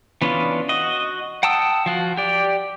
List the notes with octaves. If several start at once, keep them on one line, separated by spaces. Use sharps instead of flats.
E3 B3 C#4 D4 F4
F#4 D#5
F#5 G5 A5 D#6 E6
F3 F4 F#4
G4 D5